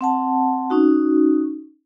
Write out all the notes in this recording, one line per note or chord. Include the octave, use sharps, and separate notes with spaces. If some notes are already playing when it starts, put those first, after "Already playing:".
C4 F#5 A5
C#4 D#4 F#4